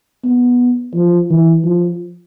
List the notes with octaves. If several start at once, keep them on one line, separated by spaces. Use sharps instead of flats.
B3
F3
E3
F3